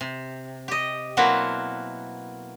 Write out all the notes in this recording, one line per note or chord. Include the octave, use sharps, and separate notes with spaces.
C3
G4 D#5
B2 F#3 A#3 C4 E4 F#4